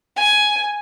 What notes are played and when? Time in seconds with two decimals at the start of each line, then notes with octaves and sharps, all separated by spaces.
0.16 G#5